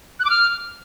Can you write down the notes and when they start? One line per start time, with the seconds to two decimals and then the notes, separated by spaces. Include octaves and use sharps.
0.20 F#6
0.25 D6
0.30 F6